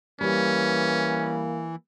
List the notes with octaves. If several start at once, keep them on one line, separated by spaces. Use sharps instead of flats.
E3 G3 A#3 C#4